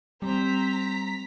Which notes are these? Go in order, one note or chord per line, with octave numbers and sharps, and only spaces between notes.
G3 C4 A#5 B6